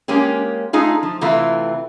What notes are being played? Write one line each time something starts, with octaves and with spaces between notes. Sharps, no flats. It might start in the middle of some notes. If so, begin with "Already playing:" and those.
G#3 A#3 C#4 G4 G#4
A3 D#4 F4 G#4
F3
C3 E3 A3 E4 F4